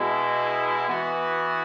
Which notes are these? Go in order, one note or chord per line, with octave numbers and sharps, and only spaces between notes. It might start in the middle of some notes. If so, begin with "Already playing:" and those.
Already playing: B2 G#3 E4
E3 B3 F#4